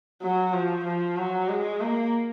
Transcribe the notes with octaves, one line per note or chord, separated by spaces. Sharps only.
F#3
F3
F3
F#3
G#3
A#3